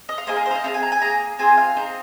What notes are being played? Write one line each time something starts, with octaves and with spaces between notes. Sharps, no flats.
D#5
F5
A#3 D#4 G#4 C5
A#4
C5
F5
D#5
C4 D#4 G#4 F5
G#5
A#5
G#5
A#3 G#4 A#5
C4 F4 G#4 G#5
F5
C4 D#4 G#4